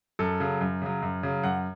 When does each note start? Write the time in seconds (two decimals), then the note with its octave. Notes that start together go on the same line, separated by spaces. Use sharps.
0.19 F#2 A4
0.40 C#3 F#3
0.61 F#2
0.82 C#3 F#3
1.02 F#2
1.23 C#3 F#3
1.43 F#2 F#5